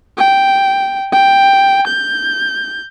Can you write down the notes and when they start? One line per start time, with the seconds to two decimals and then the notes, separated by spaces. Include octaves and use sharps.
0.17 G5
1.12 G5
1.88 G6